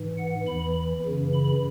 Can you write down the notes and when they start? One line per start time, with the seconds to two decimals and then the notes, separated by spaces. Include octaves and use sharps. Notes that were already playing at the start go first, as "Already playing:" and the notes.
Already playing: G#2 E3
0.17 F#5
0.46 E2 E3 B5
1.05 F#2 C#3 E3
1.33 B5